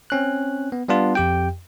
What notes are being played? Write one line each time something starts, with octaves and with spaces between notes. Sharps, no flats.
C4 C#4 F#6
B3
G3 B3 D4 F4
F2 G4 G5